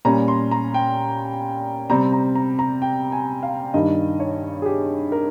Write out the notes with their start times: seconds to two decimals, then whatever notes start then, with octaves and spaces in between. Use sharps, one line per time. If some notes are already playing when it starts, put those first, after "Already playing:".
0.05 A#2 G3 C#4 A#5
0.28 C6
0.51 A#5
0.74 G5
1.90 C3 G3 C4 A#5
2.12 A#5
2.35 A#5
2.59 A#5
2.82 G5
3.12 G#5
3.43 F5
3.74 G2 D#3 G3 D#5
4.20 C#5
4.62 G#4
4.66 G4
5.12 A#4